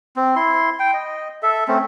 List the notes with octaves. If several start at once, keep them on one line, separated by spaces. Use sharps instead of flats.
C4
E4 C6
G5
D#5
A4 E5
A3 C4 C#4